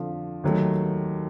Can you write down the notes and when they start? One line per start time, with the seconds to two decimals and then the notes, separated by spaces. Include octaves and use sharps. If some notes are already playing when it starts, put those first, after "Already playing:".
Already playing: F2 D3 F3
0.44 D#2 D#3 F#3 A3